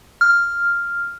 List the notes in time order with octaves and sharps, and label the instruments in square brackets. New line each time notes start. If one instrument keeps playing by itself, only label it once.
[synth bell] F6